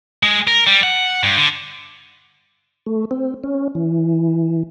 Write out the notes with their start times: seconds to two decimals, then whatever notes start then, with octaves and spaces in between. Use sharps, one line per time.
0.23 G#3
0.47 A#4
0.67 G3
0.83 F#5
1.23 G2
1.37 D3
2.86 A3
3.11 C4
3.44 C#4
3.75 E3